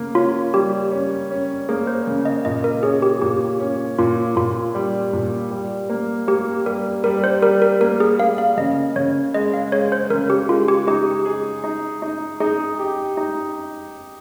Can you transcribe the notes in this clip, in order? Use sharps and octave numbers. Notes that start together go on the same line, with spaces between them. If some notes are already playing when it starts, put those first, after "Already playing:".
Already playing: C#3 A#3
C#4 F4
G3 G4
C#4
C#4
A#3 G#4
C5
C#3
D#5
A#2 D#5
A#4
C#4 G#4
G4
A#2 G4
C#4
A#2 F4
A#2 F4
G3
A#2
G3
A#3
A#3 G4
G3 A#4
G3 A#4
C5
G3 A#4
A#4
A#3 A#4
G#4
A#3 F5
F5
C#3 D#5
C#3 C#5
G#3 D#5
F5
G#3 C#5
C5
C#3 A#4
G4
G#3 F4
G4
D#4 G4
G#4
D#4
D#4
D#4 G#4
G4
D#4